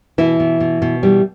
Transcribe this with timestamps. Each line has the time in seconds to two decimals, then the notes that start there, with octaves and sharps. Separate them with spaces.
0.18 B2 E3 E4
0.40 B2
0.60 B2
0.82 B2
1.03 E3 G3